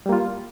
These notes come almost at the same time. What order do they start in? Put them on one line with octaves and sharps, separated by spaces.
G3 A#3 F4